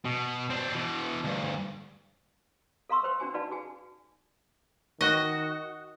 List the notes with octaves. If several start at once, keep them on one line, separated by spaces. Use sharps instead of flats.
B2
C4 D4
B2 E3
D2 G2
A4 F5 A#5 C6 C#6 E6
B4 C5 G5
C#4 D4 F#4 G#5
D#4 F#4 B4 D5 F5 A5
F#4 G#4 G#5
D#3 F#4 D#5